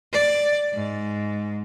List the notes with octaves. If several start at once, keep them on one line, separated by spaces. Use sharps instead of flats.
D5
G#2